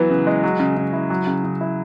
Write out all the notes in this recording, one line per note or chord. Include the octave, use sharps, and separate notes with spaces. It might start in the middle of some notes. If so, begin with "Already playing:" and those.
Already playing: E3 F#3 B3
C#3
G#3
F#3
C#3
C#3
E4
F#3
C#3
C#3
E4